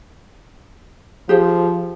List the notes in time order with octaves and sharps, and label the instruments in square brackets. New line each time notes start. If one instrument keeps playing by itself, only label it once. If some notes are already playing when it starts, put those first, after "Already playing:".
[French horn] F3 [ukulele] G4 G#4 C5